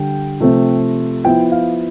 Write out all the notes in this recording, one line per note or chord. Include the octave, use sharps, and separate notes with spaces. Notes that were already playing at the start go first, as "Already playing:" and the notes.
Already playing: D3 G3 D4 G5
C3 F3 A3 C4
F3 B3 E4 G5
F5